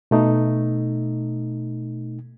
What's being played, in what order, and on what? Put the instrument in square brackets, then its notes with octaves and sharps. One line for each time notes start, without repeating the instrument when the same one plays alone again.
[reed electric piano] B2 A3 D#4